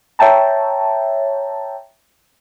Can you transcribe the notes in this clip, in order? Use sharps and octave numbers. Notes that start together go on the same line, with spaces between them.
C#5 E5 G5 A5 A#5